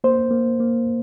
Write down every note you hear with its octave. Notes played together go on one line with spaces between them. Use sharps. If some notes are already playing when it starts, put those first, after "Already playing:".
A#3 C5
A#3
A#3